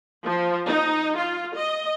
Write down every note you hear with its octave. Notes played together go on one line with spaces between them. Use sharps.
F3
D#4
F4
D#5